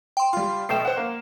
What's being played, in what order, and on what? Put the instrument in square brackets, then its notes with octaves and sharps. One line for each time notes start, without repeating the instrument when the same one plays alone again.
[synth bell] G5 C6
[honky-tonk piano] G3 F4 [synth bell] C6
[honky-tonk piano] B2 A3 G5 [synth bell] C7 E7
[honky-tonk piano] C5 F#5
A#3